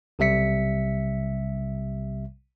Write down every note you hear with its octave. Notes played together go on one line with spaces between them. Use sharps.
B1 C3 G3 E5 B6 C#7